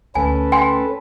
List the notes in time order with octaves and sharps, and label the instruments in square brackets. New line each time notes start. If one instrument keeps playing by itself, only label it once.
[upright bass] D2 [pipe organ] C#4 A4 B4 [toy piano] G#5
[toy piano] G5 G#5 [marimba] C6